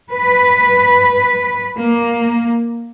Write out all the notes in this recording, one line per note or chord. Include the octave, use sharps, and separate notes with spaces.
B4
A#3